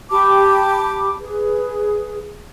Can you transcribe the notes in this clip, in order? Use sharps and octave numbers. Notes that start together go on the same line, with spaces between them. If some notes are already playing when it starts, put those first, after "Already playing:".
G4 A5 B5 D6
G#4 B4